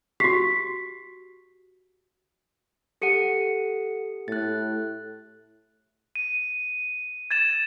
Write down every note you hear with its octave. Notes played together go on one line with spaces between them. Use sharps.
F#4 G4 B6 C7
G4 A4 F#5 C#7 D#7
A2 F#6 A6
D#7
G#6 A6 E7